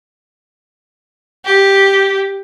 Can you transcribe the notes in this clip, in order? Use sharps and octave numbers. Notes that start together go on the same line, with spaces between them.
G4